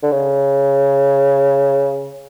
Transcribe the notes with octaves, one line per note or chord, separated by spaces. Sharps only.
D3
C#3